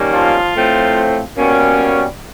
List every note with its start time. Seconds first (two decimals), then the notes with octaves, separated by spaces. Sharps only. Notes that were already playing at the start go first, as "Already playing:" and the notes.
Already playing: D#3 G3 A#3 C#4
0.11 F3 F4
0.54 A2 F3 A3 C4
1.38 B2 G3 A#3 C#4